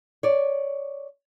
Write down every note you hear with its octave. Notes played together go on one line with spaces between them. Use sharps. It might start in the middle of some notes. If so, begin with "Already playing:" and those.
C#5 D5